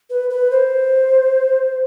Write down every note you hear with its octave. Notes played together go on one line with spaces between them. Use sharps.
B4
B4
C5